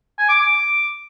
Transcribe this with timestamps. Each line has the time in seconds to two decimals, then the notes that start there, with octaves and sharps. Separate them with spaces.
0.19 G#5
0.29 D6
0.39 D6